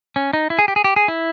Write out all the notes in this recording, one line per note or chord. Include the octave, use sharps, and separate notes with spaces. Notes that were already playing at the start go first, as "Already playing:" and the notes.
C#4
D#4
E4
G#4
G4
G#4
G4
G#4
E4